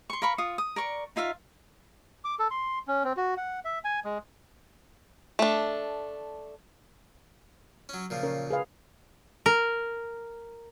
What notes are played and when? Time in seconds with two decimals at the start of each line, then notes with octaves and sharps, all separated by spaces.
0.10 C6 C#6
0.22 A#4 F5 B5 C#6
0.38 F4 C#6 D#6
0.58 D#6
0.76 A#4 D5 C#6
1.16 D#4 F4 E5 F5
2.24 D6
2.39 A4
2.51 C6
2.88 C#4
3.04 C4
3.17 F#4
3.37 F#5
3.65 E5
3.85 G#5
4.05 G#3
5.39 A3 D4
7.89 F#3 C#4
8.10 A#2 C#3 F3
8.23 C#4 A#4 C#5
8.50 G#4 B4 F5
9.46 A#4